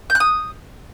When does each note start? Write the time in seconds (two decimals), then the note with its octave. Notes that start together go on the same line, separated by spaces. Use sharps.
0.10 G6
0.15 F#6
0.20 D#6